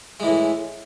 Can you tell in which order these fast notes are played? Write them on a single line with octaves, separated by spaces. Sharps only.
G#3 E3 A2